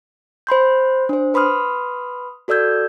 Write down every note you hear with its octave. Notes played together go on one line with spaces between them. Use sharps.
C5 B5 C6 G6
D4 C5
B4 B5 C6 D#6 F6
F#4 A4 D5 E6 G6 G#6